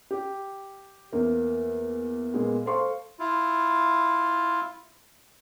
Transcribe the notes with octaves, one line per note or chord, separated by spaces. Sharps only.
G4
E2 A#3
A#2 G#3 A#3 B3
A4 C5 F5 C6 C#6
E4 F4